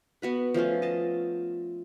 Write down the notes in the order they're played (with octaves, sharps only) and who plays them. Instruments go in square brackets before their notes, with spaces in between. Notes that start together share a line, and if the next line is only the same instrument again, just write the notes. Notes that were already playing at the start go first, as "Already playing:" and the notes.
[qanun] B3 F#4 B4
F3 A3 C#4 F4
D#5 A5